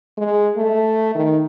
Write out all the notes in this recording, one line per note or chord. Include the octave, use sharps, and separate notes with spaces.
G#3
A3
D#3